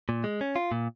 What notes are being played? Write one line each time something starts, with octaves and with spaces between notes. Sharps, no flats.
A#2
G#3
C#4
F4
A#2